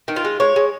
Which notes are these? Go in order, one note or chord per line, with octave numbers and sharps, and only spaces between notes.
D#3
F4
G#3
G#3 C#5
G#3